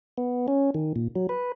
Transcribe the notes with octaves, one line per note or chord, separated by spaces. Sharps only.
B3
C#4
D#3
A#2
F#3
B4